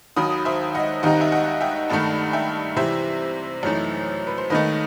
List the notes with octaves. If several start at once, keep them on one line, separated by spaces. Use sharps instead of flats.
D#2 D#3 F#3 B5 D#6
C5 E5
D#5 F#5
D#2 D#3 G3 C4 D#4 D#5 F#5
E5
D#5 F#5
E5 G5
G2 D#3 A3 F#5 A5
E5 G5
C3 E3 G3 C4 C5 E5
F#2 E3 A3 D#4
B4
C5
D#2 D#3 A3 B4 D#5